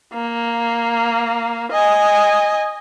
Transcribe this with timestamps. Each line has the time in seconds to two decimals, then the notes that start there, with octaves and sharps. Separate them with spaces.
0.14 A#3
1.72 D#5 G#5